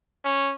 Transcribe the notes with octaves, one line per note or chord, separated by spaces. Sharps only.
C#4